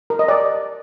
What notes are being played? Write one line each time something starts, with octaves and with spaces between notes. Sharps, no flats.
A#4
D#5
D5